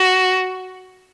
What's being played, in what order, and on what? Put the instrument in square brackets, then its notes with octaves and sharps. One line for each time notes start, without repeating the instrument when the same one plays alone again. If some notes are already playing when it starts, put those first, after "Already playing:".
Already playing: [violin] F#4